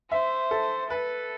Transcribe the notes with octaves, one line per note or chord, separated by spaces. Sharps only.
C5 E5
A4
A4 B4